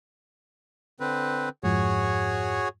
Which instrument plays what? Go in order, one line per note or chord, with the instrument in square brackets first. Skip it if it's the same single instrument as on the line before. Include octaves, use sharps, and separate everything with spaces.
[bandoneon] D3 C4 B4
[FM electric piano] F2 G#2 F3 [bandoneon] F#4 G#4 C#5